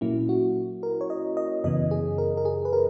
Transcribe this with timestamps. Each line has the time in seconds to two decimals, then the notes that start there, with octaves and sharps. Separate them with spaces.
0.01 A#2 F#3 A#3 C#4 E4
0.29 F#4
0.83 A#4
1.01 C#5
1.10 D#5
1.37 D#5
1.64 F#2 C#3 E3 B3 D#5
1.91 G#4
2.18 A#4
2.37 A#4
2.45 G#4
2.65 B4
2.73 A#4